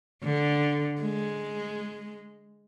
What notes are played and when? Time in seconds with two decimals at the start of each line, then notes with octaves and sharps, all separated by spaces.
0.24 D3
1.00 G#3